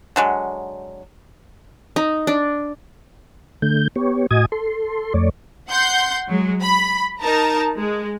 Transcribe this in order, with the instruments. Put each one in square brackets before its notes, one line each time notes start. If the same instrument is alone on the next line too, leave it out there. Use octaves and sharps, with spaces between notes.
[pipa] D3 F#3 G#3
[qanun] D#4
D4
[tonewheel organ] D3 A3 G6
B3 G4 C#5
A2 F#4 D#5 G#5 D#6 G#6
A4 C6
F2 A3 C#5 D5
[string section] F#5 C6 G6
F#3 G#3
B5
D#4 A#4 A5 A#5
G#3